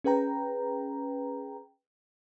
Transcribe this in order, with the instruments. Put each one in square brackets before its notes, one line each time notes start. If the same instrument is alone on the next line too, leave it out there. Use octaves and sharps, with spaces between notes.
[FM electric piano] C#4 G#4 B4 G5 A#5